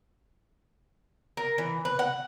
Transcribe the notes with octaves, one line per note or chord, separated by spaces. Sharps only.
A#4
E3
B4
F#5